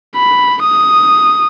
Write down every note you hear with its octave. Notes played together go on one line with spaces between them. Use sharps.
B5
D#6